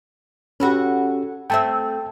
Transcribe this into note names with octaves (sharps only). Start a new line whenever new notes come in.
C#4 F#4 G4 A4 B4
A3 C4 E5 G5 A5